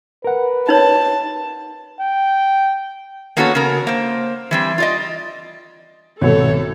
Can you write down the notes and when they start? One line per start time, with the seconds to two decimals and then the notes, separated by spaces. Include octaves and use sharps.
0.24 A#4 B4 F#5
0.69 D#4 C#5 A5
2.00 G5
3.37 A#3 B3 C#4 F#4 A4 C#5
3.55 C#3 A#4
3.87 A#3 C5
4.51 E3 G3 C4
4.78 F4 D5 D#5
6.21 C2 G#2 B2 D#3 A4 C#5